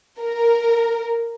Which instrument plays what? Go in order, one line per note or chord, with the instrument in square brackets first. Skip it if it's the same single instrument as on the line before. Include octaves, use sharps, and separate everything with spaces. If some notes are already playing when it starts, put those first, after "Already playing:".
[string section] A#4